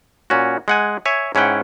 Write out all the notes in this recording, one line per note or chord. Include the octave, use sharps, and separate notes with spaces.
A#2 C#4 F#4
G#3 F#5 G#5
C#5 E5 G#5
G#2 C#4 E4 F#5 G5